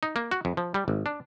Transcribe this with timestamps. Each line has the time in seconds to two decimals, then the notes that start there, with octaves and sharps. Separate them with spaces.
0.03 D#4
0.16 A#3
0.31 F#4
0.45 F2
0.57 F3
0.74 G3
0.88 G#1
1.06 D4